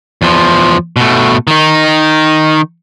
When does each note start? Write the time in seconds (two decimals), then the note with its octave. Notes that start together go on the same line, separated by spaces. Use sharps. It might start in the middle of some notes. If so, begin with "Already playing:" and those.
0.22 E2 F3
0.96 B2 A3
1.47 D#3 D#4